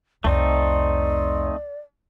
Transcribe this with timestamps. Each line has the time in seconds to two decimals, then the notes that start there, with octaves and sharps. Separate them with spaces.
0.24 C2 F2 A3 C4 D#4 D5